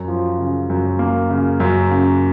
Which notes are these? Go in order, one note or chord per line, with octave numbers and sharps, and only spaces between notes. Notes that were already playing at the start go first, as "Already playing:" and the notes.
Already playing: F#2
F3
C#3
F#2
A#3
C#3
F#2
C#3